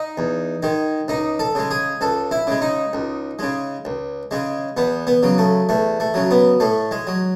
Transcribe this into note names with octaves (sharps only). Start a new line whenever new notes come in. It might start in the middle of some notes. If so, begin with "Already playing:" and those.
Already playing: D#4
E2
D#3 G#3
C#2 D#4
A4
C#3 G#3
G#4
C#2 A4
E4
C#3 G#3
D#4
C#2
C#3 G#3
C#2
C#3 G#3
E2 B3
B3
C#3 F#3
A3
E2 A3
A3
C#3 F#3
B3
A2 A3
G#3
F#3